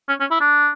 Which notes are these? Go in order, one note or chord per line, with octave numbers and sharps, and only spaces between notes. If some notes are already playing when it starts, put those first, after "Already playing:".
C#4
C#4
E4
D4